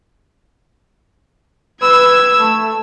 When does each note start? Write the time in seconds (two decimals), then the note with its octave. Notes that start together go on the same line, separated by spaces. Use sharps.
1.82 B4 E6 G#6
2.39 A3